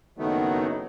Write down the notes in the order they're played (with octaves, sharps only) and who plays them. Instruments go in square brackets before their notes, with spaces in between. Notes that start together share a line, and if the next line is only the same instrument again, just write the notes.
[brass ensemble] F#1 F#3 D#4 [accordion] D#3 A3 B3